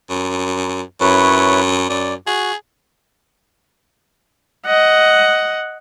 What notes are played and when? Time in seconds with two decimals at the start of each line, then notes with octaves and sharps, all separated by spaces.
0.10 F#2
1.01 F#2 E4 B4 C#5
1.89 F#2 D5
2.27 F#4 G#4
4.66 D#5 F#5